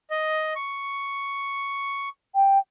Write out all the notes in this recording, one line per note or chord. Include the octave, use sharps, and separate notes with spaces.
D#5
C#6
G5